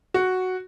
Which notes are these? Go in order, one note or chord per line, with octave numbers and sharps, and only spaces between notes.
F#4